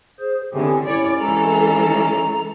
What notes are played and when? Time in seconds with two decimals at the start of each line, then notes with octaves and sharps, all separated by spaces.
0.20 G#4 C5
0.54 E2 A2 D3 C4 G4 G#4
0.87 C2 C#4 E4 C#5 D5
1.20 E3 G#3 A4 A#5